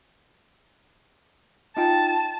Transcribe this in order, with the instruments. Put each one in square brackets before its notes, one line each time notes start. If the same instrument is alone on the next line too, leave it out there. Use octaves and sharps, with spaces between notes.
[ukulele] D#4 F4 G5 [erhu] A5